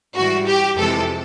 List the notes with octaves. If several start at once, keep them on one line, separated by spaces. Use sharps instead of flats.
G#2 E3 G3 F#4
G4
F2 C3 E3 G#3 A4